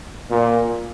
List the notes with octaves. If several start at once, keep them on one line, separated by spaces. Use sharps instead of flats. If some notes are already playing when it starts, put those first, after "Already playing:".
A#2